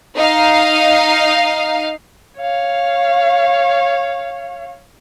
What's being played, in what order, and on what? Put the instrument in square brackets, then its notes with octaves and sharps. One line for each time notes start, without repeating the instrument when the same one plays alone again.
[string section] D#4 F5
[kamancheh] C#5 F5